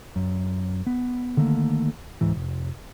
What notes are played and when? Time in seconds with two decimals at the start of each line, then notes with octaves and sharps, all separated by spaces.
0.16 F#2
0.87 B3
1.37 D3 D#3 A3 A#3
2.21 C#2 G#2 E3
2.35 F1